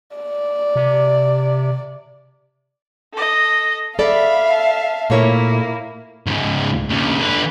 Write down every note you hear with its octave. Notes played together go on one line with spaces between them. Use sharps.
D5
C3
A4 D#5
A4 D5 E5 F5 B5
A5
A#2 A3 A#3 E4 C#5
C#2 G#2
D#2 C#3
D3 B4